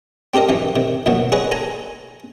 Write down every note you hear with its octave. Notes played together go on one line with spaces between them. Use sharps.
C4 G4 A4 A#4 D#5
F#2 E3 D#4
C3 D#3
A#1 F#2 B2 D#3 F#3
G#4 B4 C#5 D#5
A4 G#5 A#5